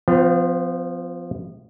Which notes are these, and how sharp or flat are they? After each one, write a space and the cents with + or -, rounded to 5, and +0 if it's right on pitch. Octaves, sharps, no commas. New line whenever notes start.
F3 +0 B3 +45